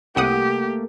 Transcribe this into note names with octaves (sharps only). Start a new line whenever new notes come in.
C2 A3 A#3 G4 F#5 D#6